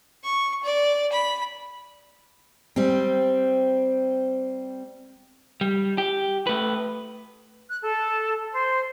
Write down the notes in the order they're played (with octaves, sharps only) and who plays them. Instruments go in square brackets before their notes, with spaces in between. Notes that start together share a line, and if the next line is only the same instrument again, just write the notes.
[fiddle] C#6
D5
B5
[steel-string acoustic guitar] G3 C4
[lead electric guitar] G3
G4
A3 B4
[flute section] F#6
A4
C5